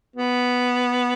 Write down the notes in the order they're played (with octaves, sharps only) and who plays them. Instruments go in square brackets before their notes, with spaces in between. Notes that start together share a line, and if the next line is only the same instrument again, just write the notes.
[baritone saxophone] B3